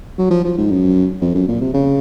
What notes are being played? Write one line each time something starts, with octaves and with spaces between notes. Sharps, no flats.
F#3
F3
F3
G#2
F#2
F2
F#2
A#2
C3
C#3